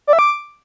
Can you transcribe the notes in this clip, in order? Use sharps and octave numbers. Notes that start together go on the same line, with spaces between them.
D5
E5
D6